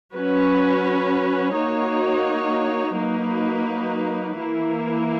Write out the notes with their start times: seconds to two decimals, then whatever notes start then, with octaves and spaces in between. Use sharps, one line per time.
0.14 F#3 C#4 F#4 B4
1.55 A#3 D#4 F#4 C#5
2.98 F#3 A#3 D#4 F#4 B4
4.39 E3 A#3 E4